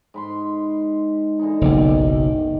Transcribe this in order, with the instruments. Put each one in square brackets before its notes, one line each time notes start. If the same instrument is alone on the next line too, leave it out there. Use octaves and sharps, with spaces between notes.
[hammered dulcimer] G#2 B5 C6
D3 E3 D#4
[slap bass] F#1 B1 [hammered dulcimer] D#3 G4